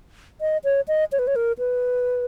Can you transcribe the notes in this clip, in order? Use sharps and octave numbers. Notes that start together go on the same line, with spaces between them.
D#5
C#5
D#5
C#5
B4
C#5
A#4
B4